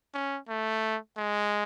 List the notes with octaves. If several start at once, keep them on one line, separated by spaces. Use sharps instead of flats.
C#4
A3
G#3